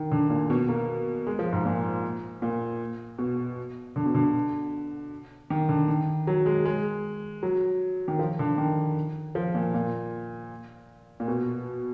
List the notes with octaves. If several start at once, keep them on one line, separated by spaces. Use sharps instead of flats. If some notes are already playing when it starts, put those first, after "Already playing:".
Already playing: D#3
D3
A#2
B2
A#3
G#3
F3
G#2
A#2
A#2
B2
D3
B2
D3
D#3
D3
D#3
F#3
G#3
G#3
F#3
D#3
F3
D3
D#3
F3
A#2
A#2
A#2
B2